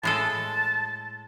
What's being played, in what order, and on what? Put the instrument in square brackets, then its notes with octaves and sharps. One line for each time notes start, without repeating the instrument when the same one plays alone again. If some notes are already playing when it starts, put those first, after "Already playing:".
[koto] A2 G#3 A4 [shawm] A5